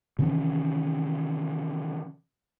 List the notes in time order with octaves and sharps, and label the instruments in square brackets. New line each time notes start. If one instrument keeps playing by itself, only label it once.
[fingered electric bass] C3 D#3 E3 C#4